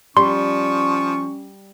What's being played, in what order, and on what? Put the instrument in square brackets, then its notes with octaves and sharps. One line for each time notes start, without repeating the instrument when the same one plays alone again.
[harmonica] F3 C#6 [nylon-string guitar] G3 [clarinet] C#4 [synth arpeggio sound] C6